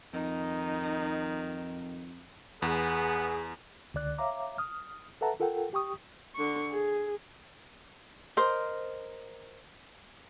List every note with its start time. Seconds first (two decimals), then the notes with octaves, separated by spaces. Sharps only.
0.13 F2 D#3 D#4
2.62 E2 B3 G#4
3.94 C#2 D3 D5 F#6
4.18 C#5 E5 F5 A#5 D6
4.58 D#6 F6
5.21 A4 B4 E5 F#5 A5 A#5
5.40 F4 A4 A#4 F#5 G5
5.73 G4 G5 C#6 D#6
6.35 D3 C#6
6.71 G#4
8.37 A#4 C5 D#5